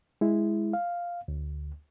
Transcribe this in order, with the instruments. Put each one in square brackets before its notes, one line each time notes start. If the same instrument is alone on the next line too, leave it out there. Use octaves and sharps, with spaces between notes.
[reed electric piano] G#3 E4
F5
D2